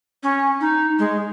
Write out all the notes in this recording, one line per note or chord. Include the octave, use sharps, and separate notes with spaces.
C#4
D#4
G#3